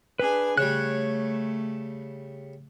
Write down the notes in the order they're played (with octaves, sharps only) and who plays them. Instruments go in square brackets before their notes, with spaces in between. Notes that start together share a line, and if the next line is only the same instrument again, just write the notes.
[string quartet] D4 G#4 G#5 [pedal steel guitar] B4
[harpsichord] C#3 G3 [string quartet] A3 [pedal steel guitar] C#5 F#6